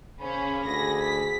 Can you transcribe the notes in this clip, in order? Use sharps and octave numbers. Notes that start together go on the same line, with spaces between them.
C#3 A#3 C#4 C5 G#5 B5
D2 G#4 A#6
B6